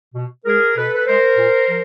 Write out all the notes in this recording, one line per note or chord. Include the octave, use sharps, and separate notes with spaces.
B2
G#3 G#4 A#4
B2 A4 B4
B4
G#3 A#4 C5
A#2
F3